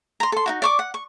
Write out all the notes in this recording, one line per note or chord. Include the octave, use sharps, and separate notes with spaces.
A#5 C6
A4 C6
D#4 E4 F#4
D5 C#6 D6
F#5
C#6